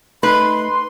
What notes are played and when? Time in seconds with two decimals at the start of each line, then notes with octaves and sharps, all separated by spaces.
0.23 A3 D#4 B4 B5 C6